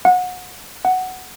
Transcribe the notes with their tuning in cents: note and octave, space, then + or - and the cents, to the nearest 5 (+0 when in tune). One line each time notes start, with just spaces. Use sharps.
F#5 -25
F#5 +5